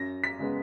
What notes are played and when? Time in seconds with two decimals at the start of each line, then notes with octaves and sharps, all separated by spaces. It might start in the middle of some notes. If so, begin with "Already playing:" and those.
Already playing: F#2 A#6
0.24 B6
0.38 C#3 G#3 B3